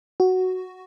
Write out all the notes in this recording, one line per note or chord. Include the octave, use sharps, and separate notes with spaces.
F#4